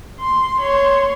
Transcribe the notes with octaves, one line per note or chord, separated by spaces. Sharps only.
C6
C#5 C6